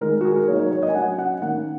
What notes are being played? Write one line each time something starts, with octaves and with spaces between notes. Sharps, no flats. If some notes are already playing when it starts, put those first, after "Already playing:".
D#3 G#3 D#4 A#4
F#4
G#4
A#4
F#3 A#3 D#4 C#5
C#5
A#4
C#5
D#5
G#5
F#3 C#4 F#5
F#5
D#3 A#3 C#4 F#5